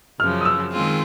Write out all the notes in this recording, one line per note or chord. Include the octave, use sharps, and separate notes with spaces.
F#2 C#3 F3 F6
D#6
E6
D#3 G#3 C4 F4 G#4